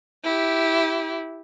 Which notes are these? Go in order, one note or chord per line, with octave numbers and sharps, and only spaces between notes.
E4 G4